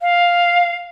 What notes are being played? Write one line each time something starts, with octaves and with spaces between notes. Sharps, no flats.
F5